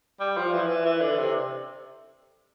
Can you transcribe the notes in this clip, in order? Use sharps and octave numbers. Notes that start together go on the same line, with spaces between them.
G3
F3
E3
E3
E3
D3
C3